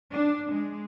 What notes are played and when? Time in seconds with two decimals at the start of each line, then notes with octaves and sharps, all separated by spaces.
0.12 D4
0.52 G#3